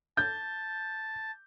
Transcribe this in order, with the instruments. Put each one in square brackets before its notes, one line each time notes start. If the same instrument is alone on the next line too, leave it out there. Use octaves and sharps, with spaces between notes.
[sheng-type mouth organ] A5 [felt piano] G6